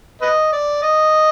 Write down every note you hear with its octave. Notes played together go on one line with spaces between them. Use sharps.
B4 D#5
D5
D#5